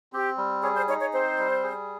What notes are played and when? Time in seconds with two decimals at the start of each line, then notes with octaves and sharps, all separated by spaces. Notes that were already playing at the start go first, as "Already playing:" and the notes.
0.13 C4 G4
0.38 G3
0.63 G#4 C#5
0.75 C5
0.88 D#4 C#5
1.00 C#5
1.13 C4 C5
1.38 G3
1.63 G#4